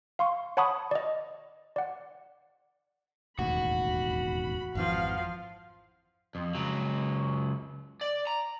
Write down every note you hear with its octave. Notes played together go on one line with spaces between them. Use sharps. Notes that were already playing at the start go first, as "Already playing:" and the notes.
F5 C6 C#6
C#5 F#5 A5 B5 C#6 D#6
D5 D#5
D5 F#5
E1 A1 D#2 F#4 B5
G#1 F2 E3 F3 F5
F2
C#2 F#3
D5
A#5